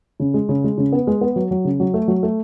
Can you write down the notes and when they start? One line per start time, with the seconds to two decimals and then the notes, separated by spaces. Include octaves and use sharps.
0.20 C#3
0.34 G#3
0.49 C#3
0.64 G#3
0.78 C#3
0.92 B3
1.07 G#3
1.21 B3
1.36 F#3
1.51 F#3
1.65 C#3
1.80 F#3
1.94 A3
2.08 F#3
2.23 A3